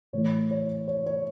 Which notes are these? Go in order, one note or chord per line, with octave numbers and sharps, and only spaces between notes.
A2 E3 A3 E4 C#5
C#5
C#5
C#5